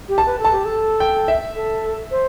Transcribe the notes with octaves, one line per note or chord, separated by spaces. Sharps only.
G4
A5
B4
A4
A5
G4
A4
G5
E5
A4
C5